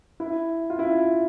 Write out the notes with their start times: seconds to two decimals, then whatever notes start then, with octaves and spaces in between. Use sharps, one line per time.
0.20 E4
0.70 F4
0.79 E4